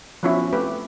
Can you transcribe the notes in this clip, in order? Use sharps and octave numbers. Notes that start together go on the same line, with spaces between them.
F3 B3 C#4 E4 F#4
A3 C4 G4 B4